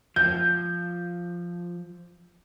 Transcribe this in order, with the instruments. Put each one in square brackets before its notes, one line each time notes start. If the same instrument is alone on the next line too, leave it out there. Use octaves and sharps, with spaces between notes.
[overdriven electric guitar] F3 [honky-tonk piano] G6